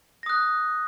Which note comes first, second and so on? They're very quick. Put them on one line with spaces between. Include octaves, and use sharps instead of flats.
A#6 D#6 F#6